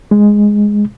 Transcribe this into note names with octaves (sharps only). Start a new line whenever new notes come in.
G#3